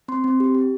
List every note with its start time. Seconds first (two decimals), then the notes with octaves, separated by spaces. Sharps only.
0.08 C4 C6
0.24 C4
0.40 G4
0.55 G4